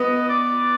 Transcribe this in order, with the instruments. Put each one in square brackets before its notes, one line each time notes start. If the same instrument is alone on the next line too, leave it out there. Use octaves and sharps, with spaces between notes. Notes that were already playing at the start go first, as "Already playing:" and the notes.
Already playing: [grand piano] B3 B4 [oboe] D#5
[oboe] D5